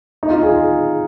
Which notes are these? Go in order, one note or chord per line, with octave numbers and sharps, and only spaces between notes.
D#4
F4
G#4